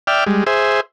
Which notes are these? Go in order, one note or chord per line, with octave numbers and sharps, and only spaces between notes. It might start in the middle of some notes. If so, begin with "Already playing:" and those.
D5 E5 G5 F6
G3 G#3
G#4 C5 E5